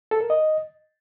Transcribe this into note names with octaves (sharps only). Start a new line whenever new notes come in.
A4
A#4
D#5